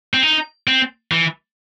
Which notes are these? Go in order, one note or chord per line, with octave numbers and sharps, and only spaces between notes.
C4
D#4
C4
E3